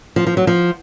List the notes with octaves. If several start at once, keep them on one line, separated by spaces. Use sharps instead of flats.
F3
F3
F#3
F3